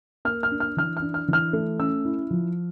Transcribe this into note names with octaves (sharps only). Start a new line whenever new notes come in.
A#3 F6
F6
D4
F6
E3 F6
F6
D4
F6
E3 F6
A3
C#4 E6
E4
F3